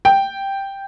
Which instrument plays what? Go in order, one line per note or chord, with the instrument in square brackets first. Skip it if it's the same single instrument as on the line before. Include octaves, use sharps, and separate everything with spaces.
[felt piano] G5